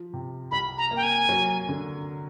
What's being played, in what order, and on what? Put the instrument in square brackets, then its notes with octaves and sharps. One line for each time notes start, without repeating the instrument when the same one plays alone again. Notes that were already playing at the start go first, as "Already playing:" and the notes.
Already playing: [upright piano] F3
C3
[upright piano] C2 [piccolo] B5
[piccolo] A#5
[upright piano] A#3
[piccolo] G5
G#5
[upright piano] F#3
D3